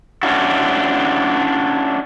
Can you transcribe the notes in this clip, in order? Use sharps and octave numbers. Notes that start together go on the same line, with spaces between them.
C#4 D4 E4 F#4